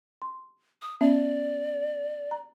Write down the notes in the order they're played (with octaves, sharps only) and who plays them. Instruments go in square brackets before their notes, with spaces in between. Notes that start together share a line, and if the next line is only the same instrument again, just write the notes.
[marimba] C6
[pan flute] D#6
[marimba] B3 C#4 E5 [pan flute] D5
[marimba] A#5